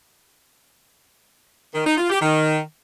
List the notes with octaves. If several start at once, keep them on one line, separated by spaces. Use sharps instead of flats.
D#3
D#4
F4
G4
D#3